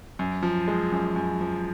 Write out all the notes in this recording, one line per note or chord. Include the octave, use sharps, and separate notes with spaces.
F#2
F3
G#3
F#2
F#2
F3